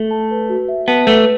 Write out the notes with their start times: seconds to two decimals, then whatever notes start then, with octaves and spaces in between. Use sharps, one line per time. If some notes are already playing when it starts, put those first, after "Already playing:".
Already playing: A3
0.11 A5
0.31 B4
0.49 F#4
0.68 E5
0.88 B3 A5
1.07 A3 B4